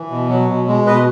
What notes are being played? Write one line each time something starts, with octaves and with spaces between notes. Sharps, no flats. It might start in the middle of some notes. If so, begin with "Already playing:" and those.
Already playing: E3
B2
F#3
B2
G#3
B2 B4 D#5